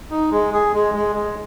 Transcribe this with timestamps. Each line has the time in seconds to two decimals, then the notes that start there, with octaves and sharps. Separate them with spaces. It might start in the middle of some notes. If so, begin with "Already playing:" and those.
0.11 D#4
0.31 G#3
0.53 G#4
0.74 G#3
0.94 G#3
1.16 G#3